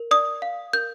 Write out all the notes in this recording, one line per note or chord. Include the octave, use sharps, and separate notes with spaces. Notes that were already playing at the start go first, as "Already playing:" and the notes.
Already playing: A#4
D5 D#6
F5
A#4 G6